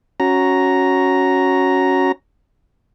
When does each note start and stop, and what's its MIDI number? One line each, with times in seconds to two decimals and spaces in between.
0.20 2.12 61
0.20 2.12 66
0.20 2.12 82